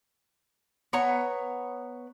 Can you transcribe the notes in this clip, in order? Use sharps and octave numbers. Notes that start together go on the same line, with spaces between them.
B3 C#5 A#5